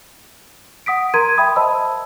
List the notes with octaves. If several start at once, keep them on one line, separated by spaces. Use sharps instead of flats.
F#5 D#6 B6 D7
A#4 A#5 C6 G#6 D#7
E5 G5 B5 D#6
C5 D#5 A5 B5 E6